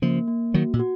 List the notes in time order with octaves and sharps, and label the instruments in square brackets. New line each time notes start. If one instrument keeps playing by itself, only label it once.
[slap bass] C#3 F3 [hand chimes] A#3
[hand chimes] A#3
[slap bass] D#3 F#3 [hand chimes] F#4
[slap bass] A#2
[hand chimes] F#4